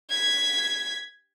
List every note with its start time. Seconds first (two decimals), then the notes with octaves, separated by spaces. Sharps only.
0.10 G#6 B6